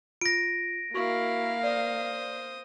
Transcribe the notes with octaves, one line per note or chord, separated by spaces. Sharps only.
F4 A#6 D7
A#3 E4 F#4 A#4 F5 C#6
C5 D5 D#6